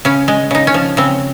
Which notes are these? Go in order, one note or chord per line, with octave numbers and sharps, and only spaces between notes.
C#3 C#4
G#3
C#3 D#4
C#4
F3
C#3 C4